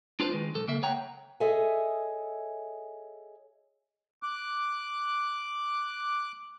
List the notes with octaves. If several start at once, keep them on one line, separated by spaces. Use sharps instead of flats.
D4 F4 B4 C5
D#3 G#3
B1 A4
C#3 A#3 E5
C#5 F#5 G5 A#5
G#4 A4 C#5 D#5 E5 G#5
D6 F#6